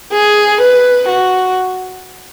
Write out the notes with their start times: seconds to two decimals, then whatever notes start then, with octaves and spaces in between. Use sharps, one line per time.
0.12 G#4
0.61 B4
1.09 F#4